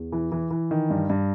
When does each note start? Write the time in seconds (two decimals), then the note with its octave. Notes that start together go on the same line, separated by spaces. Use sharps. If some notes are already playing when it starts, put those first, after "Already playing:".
Already playing: E2
0.12 E3
0.32 E3
0.51 E3
0.71 D#3
0.90 G2
1.10 G2